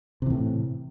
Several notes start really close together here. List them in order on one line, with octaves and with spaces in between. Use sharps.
C3 E3 A2